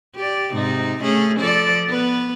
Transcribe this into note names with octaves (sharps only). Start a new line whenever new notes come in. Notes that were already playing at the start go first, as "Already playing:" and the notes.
G4 D5
G#2 C3 D#4
A3 C#4 G#4
F3 A4 D5
B3 B4